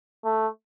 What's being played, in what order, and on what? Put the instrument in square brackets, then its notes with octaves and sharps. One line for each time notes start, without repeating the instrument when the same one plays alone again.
[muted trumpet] A3